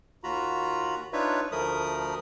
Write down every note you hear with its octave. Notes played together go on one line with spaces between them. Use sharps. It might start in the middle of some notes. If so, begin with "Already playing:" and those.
D#2 F4 F#4 A#5 B5
D4 D#4 F4 B4 C#5 E5
D2 F3 A3 A#4 B5 D#6